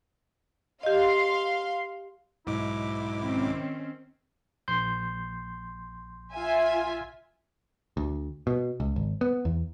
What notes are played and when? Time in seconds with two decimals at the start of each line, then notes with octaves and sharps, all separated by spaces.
0.83 G4 D#5 F5 C6
2.47 B1 G#2 E4 D6
3.21 D#3 C4 C#4
4.68 A#1 C6 G6
6.34 F4 E5 G#5
7.97 D2
8.47 B2
8.80 C#2
8.96 G#1
9.21 B3
9.45 E2